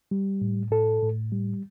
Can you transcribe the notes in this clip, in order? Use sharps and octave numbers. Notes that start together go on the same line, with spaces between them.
G3
A2
A2 A4
A2
G3